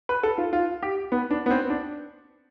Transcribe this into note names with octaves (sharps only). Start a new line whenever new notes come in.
B4
A4
F4
F4
G4
B3
D4
B3
C4
D4